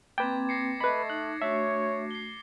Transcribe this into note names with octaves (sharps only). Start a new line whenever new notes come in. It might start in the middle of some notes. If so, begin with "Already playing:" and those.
A#3 C4 B4 G5 D6 G#6 A6
A#6 C7 C#7
A3 B4 D#5 B5
D#4 F#6
A3 D4 F#4 C#5 E5
C7 G7